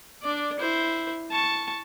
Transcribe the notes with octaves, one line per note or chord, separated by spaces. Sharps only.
D4 D5
E4 C5
A5 C#6